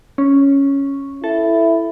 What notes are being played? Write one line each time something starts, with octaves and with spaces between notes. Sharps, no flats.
C#4
E4 A4